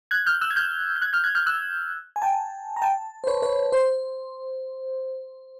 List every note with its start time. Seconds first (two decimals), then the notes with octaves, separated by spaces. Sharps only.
0.11 F#6 G#6
0.26 F6 G6
0.41 E6 F#6
0.50 G#6
0.56 F6 G6
0.96 G6
1.02 F#6 G#6
1.13 F6 G6
1.24 F#6 G#6
1.35 F6 G6
1.46 E6 F#6
2.16 G#5
2.22 G5 A5
2.76 A#5
2.82 G5 A5
3.24 C5
3.27 B4 C#5
3.42 B4 C#5
3.72 C5